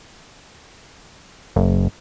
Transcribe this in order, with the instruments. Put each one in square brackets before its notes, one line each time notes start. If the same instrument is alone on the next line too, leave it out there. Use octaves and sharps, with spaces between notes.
[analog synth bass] F#1